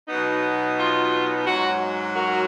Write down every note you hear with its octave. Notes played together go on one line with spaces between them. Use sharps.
B2 F#3 B3 D#4
F4
G#2 F#3 C#4 F#4
F#4 A#4